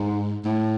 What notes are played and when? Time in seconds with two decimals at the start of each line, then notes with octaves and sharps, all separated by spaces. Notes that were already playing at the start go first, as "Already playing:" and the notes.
Already playing: G#2
0.45 A2